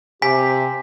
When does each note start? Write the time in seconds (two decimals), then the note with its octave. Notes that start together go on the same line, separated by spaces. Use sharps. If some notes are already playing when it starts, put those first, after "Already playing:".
0.22 C3 G4 G#5 B6